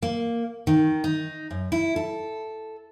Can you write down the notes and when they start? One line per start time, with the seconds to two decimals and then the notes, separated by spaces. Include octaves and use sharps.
0.02 A#3
0.67 D#3
1.04 D#4
1.51 F#2
1.72 E4
1.96 A4